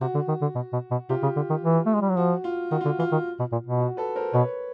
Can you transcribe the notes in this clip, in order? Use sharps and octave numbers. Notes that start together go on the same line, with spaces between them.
C3 F#4
D3
D#3
D3
B2
B2
B2
C3 F4 G4
C#3
D3
D#3
E3
A3
G#3
G3
F#3
F3 F#4
F4
D#3 F#4
D3 F4
E3 F4
D#3
B2
A#2
B2
F#4
A4 B4
A#4 C5
B2 B4 C#5